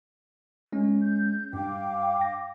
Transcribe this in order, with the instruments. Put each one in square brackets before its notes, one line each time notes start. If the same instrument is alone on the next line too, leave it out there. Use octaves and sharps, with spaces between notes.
[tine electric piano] G#3 C#4
[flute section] G6
[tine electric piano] G2 [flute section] F5 G5 D6
[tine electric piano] A#6